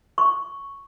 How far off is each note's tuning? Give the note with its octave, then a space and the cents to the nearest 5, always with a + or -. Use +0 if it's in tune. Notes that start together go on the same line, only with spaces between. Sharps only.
C#6 +0